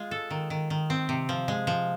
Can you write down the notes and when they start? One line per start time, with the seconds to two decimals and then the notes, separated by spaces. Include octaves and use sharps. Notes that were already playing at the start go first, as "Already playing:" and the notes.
Already playing: G#3 F4
0.11 A4
0.30 D#3
0.50 D#3
0.70 D#3
0.90 C4
1.09 C3
1.29 F3
1.48 G#3
1.67 F3